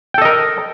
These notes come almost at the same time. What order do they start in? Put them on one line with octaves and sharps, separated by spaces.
G5 A4 D#5 A#4